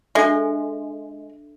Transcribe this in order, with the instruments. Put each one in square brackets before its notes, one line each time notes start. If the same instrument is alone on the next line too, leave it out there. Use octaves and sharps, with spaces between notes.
[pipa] G#3 [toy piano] D4 A4 E5